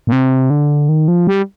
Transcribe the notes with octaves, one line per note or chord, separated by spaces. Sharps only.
A#2
C3
D3
D#3
F3
G3